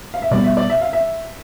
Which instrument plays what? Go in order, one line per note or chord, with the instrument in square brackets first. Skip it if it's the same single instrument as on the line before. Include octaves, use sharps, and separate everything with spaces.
[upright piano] F5
E5
[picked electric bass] B2 G3 B3 [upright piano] D5
[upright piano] E5
D5
E5
F5
E5